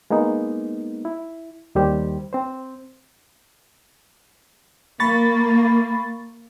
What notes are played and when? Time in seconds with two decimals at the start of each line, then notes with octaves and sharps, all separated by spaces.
0.10 G#3 A#3 B3 D#4
1.05 E4
1.75 D#2 D#3 G3 G4 C5
2.33 C4 C5
5.00 A#3 B5 C#6 A6